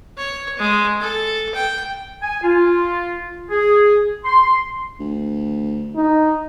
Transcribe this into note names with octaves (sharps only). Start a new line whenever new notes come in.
C#5
G#3
A4
G5
G#5
F4
G#4
C6
D2
D#4